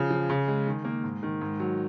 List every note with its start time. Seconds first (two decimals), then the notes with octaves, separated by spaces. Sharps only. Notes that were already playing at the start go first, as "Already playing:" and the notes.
Already playing: C#3 F3
0.10 F3
0.30 C#3
0.48 G#3
0.67 D#3
0.85 A#3
1.04 G#2
1.23 D#3
1.41 G#2
1.60 F#3